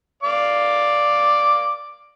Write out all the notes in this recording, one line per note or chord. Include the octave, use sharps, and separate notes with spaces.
D5 F5 D6